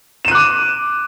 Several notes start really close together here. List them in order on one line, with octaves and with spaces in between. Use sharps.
E7 D#7 F#6 D6